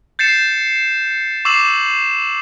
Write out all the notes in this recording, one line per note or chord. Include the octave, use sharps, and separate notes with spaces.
G6 A6 C7 C#7 E7
C#6 D6 E6 C7 E7 F#7